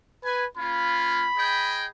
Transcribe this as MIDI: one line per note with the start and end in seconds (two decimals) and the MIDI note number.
0.25 0.46 71
0.25 0.46 80
0.58 1.25 58
0.58 1.25 61
0.58 1.25 65
0.58 1.91 83
1.38 1.87 68
1.38 1.87 75
1.38 1.87 79